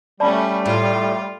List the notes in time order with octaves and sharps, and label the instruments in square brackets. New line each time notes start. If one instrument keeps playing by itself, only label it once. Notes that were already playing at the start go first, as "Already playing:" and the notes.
[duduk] G3 [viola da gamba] A3 C#4 [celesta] D5 A5 B5
[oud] A2 [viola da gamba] F4